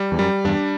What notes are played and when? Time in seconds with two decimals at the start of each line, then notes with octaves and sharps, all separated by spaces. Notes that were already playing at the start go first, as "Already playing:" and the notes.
Already playing: G3
0.12 E2
0.19 F#2 G3
0.45 E2 G2 D4